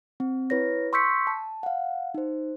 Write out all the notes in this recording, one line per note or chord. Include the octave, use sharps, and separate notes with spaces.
C4
E4 B4 C#5 A#6
C6 C#6 E6 G6 B6 C#7
A5
F5 F#5
D#4 C5